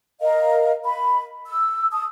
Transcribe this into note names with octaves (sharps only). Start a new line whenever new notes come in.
A#4 D#5 F5
B5
E6
A5 D#6